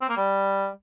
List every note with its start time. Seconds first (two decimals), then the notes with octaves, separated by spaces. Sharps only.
0.01 C4
0.09 A#3
0.17 G3